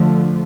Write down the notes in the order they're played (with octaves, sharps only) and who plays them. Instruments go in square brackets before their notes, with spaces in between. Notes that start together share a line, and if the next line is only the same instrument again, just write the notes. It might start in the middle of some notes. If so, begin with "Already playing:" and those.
Already playing: [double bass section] D3 F3 A3